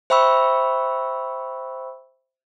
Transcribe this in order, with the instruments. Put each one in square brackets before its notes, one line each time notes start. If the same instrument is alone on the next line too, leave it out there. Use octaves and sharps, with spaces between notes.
[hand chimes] C5 E5 G5 B5 C#6 E6